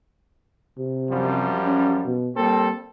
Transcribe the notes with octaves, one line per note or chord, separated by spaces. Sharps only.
C3
F#2 F3 G3
C#4
B2
G3 A#3 C4 A4